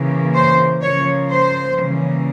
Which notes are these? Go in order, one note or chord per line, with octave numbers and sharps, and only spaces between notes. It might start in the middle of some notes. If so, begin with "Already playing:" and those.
Already playing: C#3 E3 A#3
C5
C#3 F3 A#3 C#5
C5
C#3 E3 G3 A#3